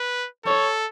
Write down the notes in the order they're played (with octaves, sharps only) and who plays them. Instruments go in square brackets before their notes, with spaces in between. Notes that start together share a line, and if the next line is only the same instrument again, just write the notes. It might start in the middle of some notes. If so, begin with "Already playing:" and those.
Already playing: [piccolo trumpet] B4
[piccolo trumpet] A4 [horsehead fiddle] C#5